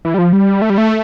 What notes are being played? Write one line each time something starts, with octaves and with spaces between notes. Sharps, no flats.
E3
G3
F3
G3
A3
G3
A3